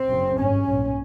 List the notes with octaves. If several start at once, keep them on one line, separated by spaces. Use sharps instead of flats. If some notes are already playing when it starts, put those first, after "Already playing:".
Already playing: C4
F#1 F#2 C#3
G#1 G2 C#4
B1 A#2